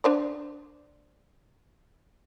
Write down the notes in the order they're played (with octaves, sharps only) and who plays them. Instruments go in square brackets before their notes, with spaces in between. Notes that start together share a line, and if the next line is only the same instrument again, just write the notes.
[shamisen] D4 C5 D5